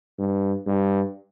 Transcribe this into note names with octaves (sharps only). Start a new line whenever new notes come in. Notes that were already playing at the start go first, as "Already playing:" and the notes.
G2
G2